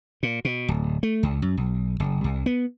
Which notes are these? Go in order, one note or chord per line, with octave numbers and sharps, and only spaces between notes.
A#2
B2
D1
A3
C#2
F#2
B1
F#1
C2
B3